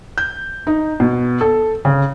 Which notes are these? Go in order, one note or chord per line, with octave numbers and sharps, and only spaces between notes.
G6
D#4
B2
A4
C#3